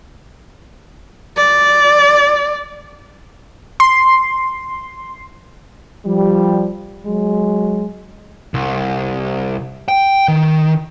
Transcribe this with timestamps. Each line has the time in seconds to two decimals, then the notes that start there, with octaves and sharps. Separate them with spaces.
1.37 D5
3.80 C6
6.06 F3 G3
7.05 F#3 G#3
8.54 C2
9.88 G5
10.28 D#3